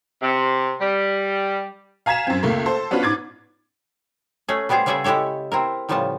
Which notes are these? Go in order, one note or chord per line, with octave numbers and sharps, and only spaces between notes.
C3
G3
F5 G#5 A#5 G#6 B6 E7
F#2 C4
C#2 A3 A#3
A4 C5 A5
B3 C#4 D4 F4 F#4 B4
G#2 D6 G#6 A6
A3 C#4 G#4
G3 B3 G4 G#4 C5
C#3 G3 G#4 A4 D5 E5
G#3 E4 G4 A4 C#5
C4 E4 A#4
A2 C#3 F3 G3 B3 A5